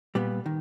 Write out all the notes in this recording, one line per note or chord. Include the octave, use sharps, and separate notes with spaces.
A#2 G3 B3
D#3